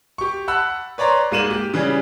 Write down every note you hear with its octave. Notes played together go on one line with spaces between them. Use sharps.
G4 C#6
F#5 A5 B5 E6 F#6
B4 C#5 D5 A#5 C6
G#2 G#3 A#3 D#7 E7 F#7
G4
C#3 E3 G3 G#4